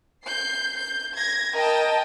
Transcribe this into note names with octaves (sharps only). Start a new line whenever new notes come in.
G6 C7
G6
G#6 A#6
A#4 D#5 G5 A5